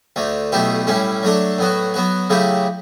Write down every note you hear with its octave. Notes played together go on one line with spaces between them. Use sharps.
D2 D3 A3
B1 B2 A3 E4 G4
A2 G3 C#4 E4
F#3 A3 D4 A4
A2 F#3 B3 F#4
F#3 B3 F#4
C#3 F#3 A3 E4 G4